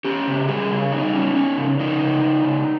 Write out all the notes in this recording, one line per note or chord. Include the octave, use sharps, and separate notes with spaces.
C#4 G4
C#3
G3 G#4
C#3
G3 D#4
C#4
C#4
C#3
C#3 D#4
C#3
C#3
C#3